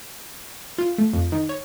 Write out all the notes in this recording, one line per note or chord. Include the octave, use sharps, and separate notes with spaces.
F4
A3
F2
D#3
C#5